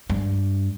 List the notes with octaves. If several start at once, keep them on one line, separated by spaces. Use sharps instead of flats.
G2